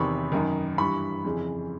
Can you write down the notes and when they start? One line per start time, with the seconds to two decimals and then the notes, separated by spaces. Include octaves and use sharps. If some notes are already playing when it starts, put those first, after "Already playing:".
Already playing: E2 C3 D#3 B5 C#6
0.32 F#2 D#3
0.78 G2 E3 B5 C#6
1.25 F2 C#3 E3